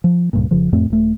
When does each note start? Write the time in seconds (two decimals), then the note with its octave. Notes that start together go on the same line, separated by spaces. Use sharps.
0.04 F3
0.33 C#2 G2 A#2
0.51 F1 C#3 F3
0.73 F2 A2 A3 C4
0.90 D#1 A3